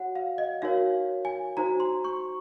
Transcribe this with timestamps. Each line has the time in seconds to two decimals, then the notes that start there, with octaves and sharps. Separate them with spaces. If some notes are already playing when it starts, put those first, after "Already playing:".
Already playing: F#4 C#5 F#5
0.16 F5
0.38 D#5
0.62 D#4 F#4 A#4 C#5 F5
1.25 G#5
1.57 D#4 F#4 C5 A#5
1.80 C6
2.04 C#6